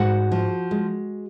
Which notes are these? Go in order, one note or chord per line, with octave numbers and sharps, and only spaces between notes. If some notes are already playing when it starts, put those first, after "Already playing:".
Already playing: G#2 F#4 F#5
F3
G#3